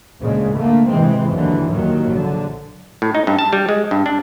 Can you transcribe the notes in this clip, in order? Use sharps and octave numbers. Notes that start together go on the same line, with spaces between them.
D2 A#2 C#3 G#3
D3 A3 A#3
C3 E3 G#3 C4
D#2 D3 E3 F#3
D#2 A#2 D#3 F#3
A#1 D3
A2
D#4
G2
A5
G3
G#3
G2
D4